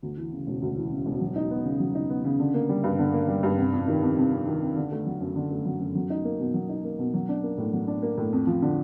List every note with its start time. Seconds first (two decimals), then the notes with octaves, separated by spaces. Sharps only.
0.02 D2
0.17 E3
0.32 C#3
0.47 E1
0.62 D2
0.77 E3
0.92 C#3
1.06 E1
1.21 F#3
1.36 D#4
1.51 B3
1.65 C#3
1.80 F#3
1.95 D#4
2.10 B3
2.25 C#3
2.39 D3
2.54 A#3
2.69 G3
2.84 G2
2.99 D3
3.14 A#3
3.28 G3
3.43 G2
3.58 C3
3.73 F2
3.88 D#3
4.02 F2
4.18 C3
4.32 F2
4.47 D#3
4.62 F2
4.76 D3
4.91 A3
5.06 F#3
5.20 F#2
5.36 D3
5.51 A3
5.65 F#3
5.80 F#2
5.95 F#3
6.10 D#4
6.25 A#3
6.39 B2
6.54 F#3
6.69 D#4
6.84 A#3
6.99 B2
7.14 F#3
7.29 D4
7.43 A#3
7.58 A2
7.73 F#3
7.87 D4
8.02 A#3
8.18 A2
8.33 F2
8.47 F3
8.62 D3